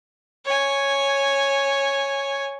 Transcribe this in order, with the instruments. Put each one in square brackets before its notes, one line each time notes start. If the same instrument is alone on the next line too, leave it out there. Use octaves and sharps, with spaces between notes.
[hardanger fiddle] C#5 G#5